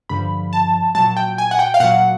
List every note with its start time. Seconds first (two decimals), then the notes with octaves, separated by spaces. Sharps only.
0.09 G2 D3 F3 B5
0.53 A5
0.95 A#2 F#3 A5
1.17 G5
1.38 G#5
1.51 F#5
1.59 G5
1.74 F5
1.80 A#2 F#3 F#5